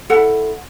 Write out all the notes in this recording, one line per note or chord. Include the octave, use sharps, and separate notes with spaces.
E4 A4 F#5